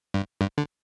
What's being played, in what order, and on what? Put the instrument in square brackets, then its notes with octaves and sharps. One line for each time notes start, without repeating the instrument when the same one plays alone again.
[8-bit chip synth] G2
G2
D3